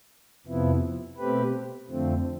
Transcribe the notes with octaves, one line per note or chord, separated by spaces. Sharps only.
F2 C3 F3 B3 E4
B2 A3 C4 G4 B4
F2 D3 F3 A3 C4